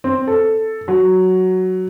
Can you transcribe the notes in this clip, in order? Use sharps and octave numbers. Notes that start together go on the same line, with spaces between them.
C4
A4
F#3